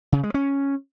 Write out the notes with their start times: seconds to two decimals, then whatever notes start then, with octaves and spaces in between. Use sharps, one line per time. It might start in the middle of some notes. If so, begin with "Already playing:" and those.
0.12 C#3
0.23 G#3
0.34 C#4